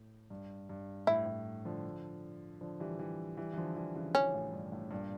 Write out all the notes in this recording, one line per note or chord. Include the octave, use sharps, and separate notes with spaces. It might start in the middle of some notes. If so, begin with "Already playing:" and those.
Already playing: A2
G2
G2
A2 E4
A2
D3 F3
D3 F3
E3 G3
E3 G3
E3 G3
E3
D3 F3
E3 G3
C#3 E3
C#3 E3 C#4
A2
G2
A2
G2 A#2